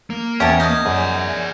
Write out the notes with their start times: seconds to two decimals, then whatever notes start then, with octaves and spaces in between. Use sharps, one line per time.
0.10 A#3
0.40 E2 C#4 G4 G5 A5 G#6
0.60 D#5 D#6 G6 A#6
0.86 F#2 G#4 D5